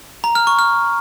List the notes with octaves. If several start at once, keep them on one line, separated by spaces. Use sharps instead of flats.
A#5
F6
C#6
F6